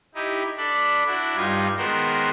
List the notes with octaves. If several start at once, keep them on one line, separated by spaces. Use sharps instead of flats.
D#4 E4 G4
D4 A4 D5 B5
D4 E4 F#4
G2 G3 D#4 F4 G#6
D#3 G#3 B3 F#4 A#4 C5